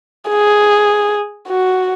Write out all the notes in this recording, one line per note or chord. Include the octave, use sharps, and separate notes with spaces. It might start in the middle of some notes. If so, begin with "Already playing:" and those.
G#4
F#4